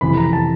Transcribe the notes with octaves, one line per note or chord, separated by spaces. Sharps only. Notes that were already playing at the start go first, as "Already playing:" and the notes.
F2 C3 E3 B5
A#5
A5